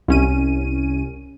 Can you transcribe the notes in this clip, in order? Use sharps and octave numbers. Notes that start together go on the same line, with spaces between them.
C2 C#4 D#7